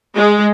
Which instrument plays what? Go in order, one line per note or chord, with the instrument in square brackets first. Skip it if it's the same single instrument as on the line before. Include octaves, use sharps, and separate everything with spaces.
[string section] G#3